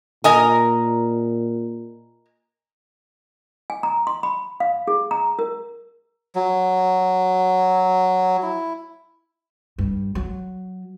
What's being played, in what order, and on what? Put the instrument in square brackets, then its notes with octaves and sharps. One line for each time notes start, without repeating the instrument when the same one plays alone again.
[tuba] A#2 [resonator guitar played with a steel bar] A#4 D#5 G#5
[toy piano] G#5
A#5
C6
B5
F5
G#4
A#5
A#4
[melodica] F#3
E4
[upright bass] G2
F#3